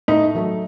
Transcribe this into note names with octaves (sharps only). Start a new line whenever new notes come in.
A2 D#4
F#3 A3